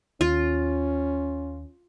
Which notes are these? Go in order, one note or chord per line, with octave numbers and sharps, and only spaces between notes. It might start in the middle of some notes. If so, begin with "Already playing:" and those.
D#2 C#4 F4